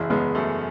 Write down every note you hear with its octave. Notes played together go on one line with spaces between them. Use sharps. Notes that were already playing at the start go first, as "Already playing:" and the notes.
Already playing: F#1 E2 E4 G#4
F#1 G#3 B3
F#2 A3